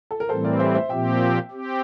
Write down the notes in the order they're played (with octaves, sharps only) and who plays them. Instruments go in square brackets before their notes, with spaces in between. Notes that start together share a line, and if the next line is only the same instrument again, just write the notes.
[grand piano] A4
A#4
[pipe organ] A2 E3 G3 C4 [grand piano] A4 C5
[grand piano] A#4 D5
C5 E5
C5 E5
[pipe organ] A#2 F3 C4 G4 [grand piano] E5 G5
[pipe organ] C4 G4